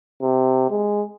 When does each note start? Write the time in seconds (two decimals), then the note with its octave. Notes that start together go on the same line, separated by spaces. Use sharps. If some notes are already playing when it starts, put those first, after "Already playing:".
0.22 C3
0.70 G#3